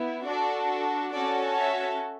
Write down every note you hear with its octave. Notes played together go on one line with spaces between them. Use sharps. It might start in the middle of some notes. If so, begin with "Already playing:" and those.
Already playing: B3 E4
D4 F#4 A4 D5
C#4 F#4 A4 D5
C#5 E5